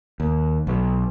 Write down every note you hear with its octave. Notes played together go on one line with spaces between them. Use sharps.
D#2
B1